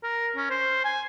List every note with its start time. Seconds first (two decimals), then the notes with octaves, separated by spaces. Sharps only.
0.03 A#4
0.36 C#4
0.50 C5
0.84 G#5